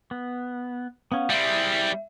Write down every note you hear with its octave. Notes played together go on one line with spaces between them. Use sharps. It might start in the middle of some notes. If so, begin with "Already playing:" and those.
B3
B3 C#4 F5 F#5
G3 C4 E4 G#4 E5 G6